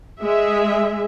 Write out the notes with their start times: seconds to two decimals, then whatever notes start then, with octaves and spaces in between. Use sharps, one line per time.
0.20 G#3 G#4 E5